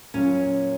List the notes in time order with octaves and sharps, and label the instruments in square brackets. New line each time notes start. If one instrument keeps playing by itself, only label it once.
[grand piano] A#2 F#3 A#3 F4 [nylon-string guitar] C#4